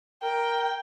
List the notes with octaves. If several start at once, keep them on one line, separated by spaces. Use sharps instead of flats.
A#4 G5